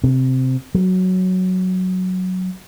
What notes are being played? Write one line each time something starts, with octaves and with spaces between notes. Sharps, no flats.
C3
F#3